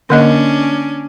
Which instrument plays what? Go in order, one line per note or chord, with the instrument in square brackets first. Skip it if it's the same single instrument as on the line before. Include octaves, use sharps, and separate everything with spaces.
[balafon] D3 A#3 D#5 [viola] C#4 D4